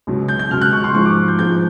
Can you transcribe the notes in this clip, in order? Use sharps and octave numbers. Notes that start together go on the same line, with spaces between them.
C#2 B2 F#3
G6
G6
C#2 B2 F#3 F6
F#6
C#6
C6
G#2 F3 G#3 C#6
D6
G6
G#2 F3 G#3 G6